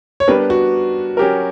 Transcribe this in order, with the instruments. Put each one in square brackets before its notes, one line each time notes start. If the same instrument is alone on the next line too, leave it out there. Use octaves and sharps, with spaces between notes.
[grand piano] C#5
[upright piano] G3 B3 D4 G4 A#4 [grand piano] B4
[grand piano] F#4
[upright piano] F#3 C#4 G4 A#4